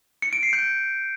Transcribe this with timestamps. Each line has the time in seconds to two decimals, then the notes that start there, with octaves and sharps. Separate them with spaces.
0.22 C#7
0.33 D7
0.43 C7
0.53 G6